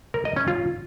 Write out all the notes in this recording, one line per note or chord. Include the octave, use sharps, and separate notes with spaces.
A#4
D#5
C#4
F4